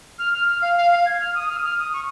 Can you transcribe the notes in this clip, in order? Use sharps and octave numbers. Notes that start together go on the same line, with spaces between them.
F6
F6
F6
F5
F5
F5
G#6
F6
D#6
F6
D#6
F6
D#6
C#6